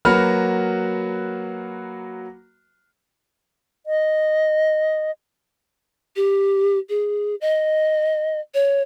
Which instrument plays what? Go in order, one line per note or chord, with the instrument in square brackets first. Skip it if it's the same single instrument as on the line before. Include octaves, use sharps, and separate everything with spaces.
[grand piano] F#3 A#3 F#4 B4 B5 F6
[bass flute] D#5
[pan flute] G4
G#4
D#5
C#5